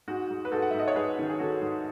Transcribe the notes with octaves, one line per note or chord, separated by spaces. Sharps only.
G#2 F#4
G#2
B4
G#2 F#4 A4
F#5
E5
G#2
D#5
C#5
G#2 G#4 B4
D#3
G#4
D#3 F#4 A4
G#2